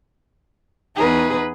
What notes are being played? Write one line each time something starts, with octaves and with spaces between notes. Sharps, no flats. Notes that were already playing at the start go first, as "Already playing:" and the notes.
E2 D#4 G#4 B4